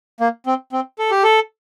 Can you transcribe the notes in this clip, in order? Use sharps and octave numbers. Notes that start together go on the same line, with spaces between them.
A#3
C4
C4
A4
G4
A4